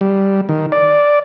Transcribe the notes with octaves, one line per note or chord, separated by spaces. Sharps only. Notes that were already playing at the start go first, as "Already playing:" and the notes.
G3
D#3
D5